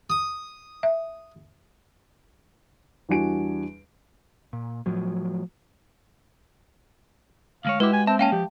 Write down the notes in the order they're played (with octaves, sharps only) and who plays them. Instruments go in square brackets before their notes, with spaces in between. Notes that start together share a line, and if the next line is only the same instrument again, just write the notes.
[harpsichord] D#6
[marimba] E5
[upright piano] E2 G3 D4 F#4 G#5 D7
[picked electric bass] A#2
A2 F3 F#3
[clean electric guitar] D2 G#3 C#5 [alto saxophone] F5
[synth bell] G#3 [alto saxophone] E4 [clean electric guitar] F#4 G4 [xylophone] B4 D6
[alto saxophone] G#5
[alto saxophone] C4 [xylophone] E5 [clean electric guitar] A5
[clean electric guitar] A#3 [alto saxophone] C#4 [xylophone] F5 G5 A5
[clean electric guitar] F3 [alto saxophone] G4